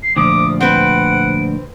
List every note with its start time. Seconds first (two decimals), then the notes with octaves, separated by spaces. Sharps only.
0.03 C7
0.16 D2 A#2 F3 D6 D#6
0.60 C4 B4 F#5 D7